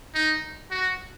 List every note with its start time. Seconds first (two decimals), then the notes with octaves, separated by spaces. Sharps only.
0.14 D#4
0.71 F#4